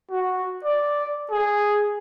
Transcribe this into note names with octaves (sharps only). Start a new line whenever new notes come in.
F#4
D5
G#4